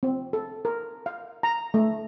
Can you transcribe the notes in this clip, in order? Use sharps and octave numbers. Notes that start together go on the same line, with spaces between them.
C4
A4
A#4
F5
A#5
A3